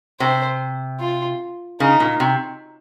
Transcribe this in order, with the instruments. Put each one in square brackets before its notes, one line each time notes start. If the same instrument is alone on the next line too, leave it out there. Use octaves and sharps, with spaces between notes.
[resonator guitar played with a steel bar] C3 [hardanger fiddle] C5
[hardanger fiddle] F4
[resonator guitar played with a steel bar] C#3 [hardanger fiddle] D#4
[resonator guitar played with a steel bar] A#2
C3